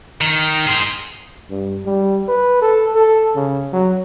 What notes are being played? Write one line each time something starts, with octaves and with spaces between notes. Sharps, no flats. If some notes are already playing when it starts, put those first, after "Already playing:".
D#3
G#4 C5
G2
G3
B4
A4
A4
C#3
F#3